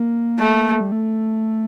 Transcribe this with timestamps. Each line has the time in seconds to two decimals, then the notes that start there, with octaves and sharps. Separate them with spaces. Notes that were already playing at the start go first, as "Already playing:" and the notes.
Already playing: A#3
0.39 A3
0.80 G3
0.92 A3